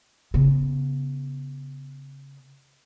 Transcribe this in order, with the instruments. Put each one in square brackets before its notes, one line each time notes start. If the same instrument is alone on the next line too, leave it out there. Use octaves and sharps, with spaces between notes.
[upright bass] C#3 B3